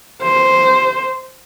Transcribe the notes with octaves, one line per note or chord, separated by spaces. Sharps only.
C5